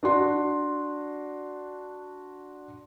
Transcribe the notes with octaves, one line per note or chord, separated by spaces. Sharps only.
D4 F#4 C6